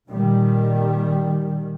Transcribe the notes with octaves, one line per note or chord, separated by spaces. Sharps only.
A#2 D#3 G3